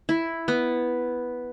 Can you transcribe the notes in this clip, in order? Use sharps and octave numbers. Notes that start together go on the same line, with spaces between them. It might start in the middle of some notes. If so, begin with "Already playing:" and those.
E4
B3